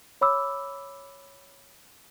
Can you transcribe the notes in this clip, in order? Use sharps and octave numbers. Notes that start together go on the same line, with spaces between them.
C#5 B5 D6 E6